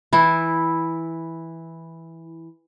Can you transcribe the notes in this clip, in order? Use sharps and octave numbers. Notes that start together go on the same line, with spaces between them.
E3 E4